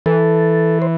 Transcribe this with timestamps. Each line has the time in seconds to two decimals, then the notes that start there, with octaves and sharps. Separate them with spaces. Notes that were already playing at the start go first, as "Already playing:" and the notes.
0.06 E3 A4
0.82 C5